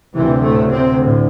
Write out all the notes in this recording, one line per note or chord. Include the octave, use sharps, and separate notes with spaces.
D2 C3 E3
A2 A3
C3 C4
A2